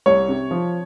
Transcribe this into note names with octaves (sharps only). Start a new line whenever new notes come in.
C2 C#5
C3
F3